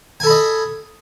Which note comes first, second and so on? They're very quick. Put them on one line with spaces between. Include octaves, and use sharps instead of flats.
G#5 A4 B5 D#5